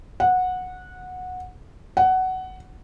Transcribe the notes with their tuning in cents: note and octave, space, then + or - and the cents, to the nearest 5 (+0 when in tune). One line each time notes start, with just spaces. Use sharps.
F#5 -15
F#5 +15